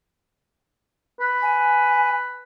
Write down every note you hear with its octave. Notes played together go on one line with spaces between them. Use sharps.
B4
G#5